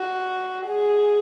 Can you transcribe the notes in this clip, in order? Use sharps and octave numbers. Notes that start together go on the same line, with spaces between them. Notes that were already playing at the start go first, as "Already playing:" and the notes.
Already playing: F#4
G#4